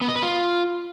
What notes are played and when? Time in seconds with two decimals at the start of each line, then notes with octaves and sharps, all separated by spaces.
0.01 B3
0.08 D#5
0.16 B4
0.23 F4